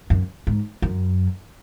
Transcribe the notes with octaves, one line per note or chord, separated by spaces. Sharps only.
F#2
G#2
F#2